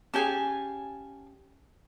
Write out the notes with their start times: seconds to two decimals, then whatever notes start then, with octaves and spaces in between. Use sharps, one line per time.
0.14 C#4 G4 G#4 F5 G#5 A5